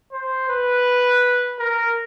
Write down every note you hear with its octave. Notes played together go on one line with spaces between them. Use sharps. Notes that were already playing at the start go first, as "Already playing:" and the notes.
C5
B4
A#4